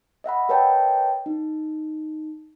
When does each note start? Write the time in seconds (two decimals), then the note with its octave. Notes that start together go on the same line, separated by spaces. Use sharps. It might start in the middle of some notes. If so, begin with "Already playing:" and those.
0.24 D#5 E5 F#5 B5
0.49 A#4 B4 C#5 D#5 G5 A5
1.26 D#4